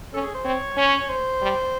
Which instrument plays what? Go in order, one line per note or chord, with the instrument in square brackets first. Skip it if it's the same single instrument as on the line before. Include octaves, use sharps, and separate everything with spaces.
[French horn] C#4 [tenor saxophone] A4
[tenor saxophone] G#4
C5
[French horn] C4 [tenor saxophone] C#5
[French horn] C#4
[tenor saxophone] C5
[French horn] G3